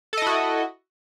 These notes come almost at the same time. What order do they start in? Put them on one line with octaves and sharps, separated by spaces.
A4 D#5 E4 F#4